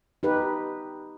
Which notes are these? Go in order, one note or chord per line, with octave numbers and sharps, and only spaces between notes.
D#4 G4 B4